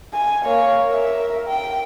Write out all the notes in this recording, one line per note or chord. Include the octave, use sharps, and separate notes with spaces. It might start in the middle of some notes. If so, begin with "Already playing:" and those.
G#5
A#3 C#5
A#4 E5
G5